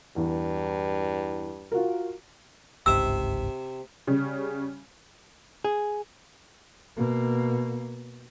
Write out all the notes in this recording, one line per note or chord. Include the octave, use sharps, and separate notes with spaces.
E2 G2
F4 F#4 A#4
G1 C#2 G#2 C3 E5 E6
C#3 G3 C#4
G#4
B2 A#3